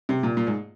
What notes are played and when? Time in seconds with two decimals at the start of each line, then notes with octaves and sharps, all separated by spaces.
0.09 C3
0.23 A#2
0.37 A#2
0.47 G#2